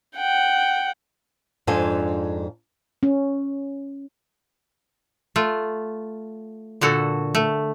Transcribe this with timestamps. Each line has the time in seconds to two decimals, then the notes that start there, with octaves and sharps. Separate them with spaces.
0.17 F#5 G5
1.67 F2 G#2 D4 F4 A4 G#5
3.03 C#4
5.36 A3 F4
6.81 A#2 D3 F#4 A4
7.35 A3